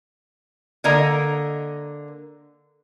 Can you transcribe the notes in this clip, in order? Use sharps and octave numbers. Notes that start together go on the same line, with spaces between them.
D3 A#3 A#4 D#5 A#5